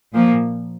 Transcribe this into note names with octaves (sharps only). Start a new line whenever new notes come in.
A#2 F3 A#3